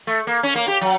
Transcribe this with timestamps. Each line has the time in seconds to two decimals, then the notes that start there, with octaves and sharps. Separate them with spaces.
0.07 A3
0.27 A#3
0.43 C#4
0.55 A#3
0.68 G4
0.81 F#3